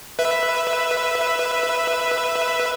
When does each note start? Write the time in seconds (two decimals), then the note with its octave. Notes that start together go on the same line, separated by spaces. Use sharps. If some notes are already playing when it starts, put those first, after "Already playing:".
0.19 B4 E5